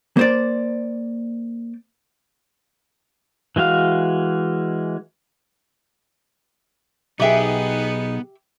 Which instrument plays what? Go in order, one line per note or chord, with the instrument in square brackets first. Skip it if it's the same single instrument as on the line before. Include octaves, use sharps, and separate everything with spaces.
[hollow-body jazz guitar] A#3 C5 D5
[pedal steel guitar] E3 G#3 F#4 F5
[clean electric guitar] B1 G#4 [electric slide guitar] B3 [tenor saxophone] D#4 [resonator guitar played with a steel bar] G4 E5 G5